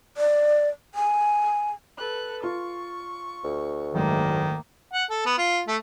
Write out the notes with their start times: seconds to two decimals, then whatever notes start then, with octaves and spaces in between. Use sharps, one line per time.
0.17 D5
0.95 G#5
1.98 A4 B4 F#6
2.44 F4 C#6
3.44 D2
3.94 F#1 G#2 D#3 A3 A#3
4.93 F#5
5.10 A4
5.26 B3
5.38 F4
5.68 A3